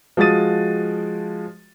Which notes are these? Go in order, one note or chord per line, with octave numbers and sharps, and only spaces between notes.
F3 G#3 F#4 D#6 A6 D#7